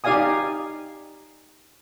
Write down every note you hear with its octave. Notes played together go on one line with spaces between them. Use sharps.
D#4 G4 D5 F5 G#5 D#6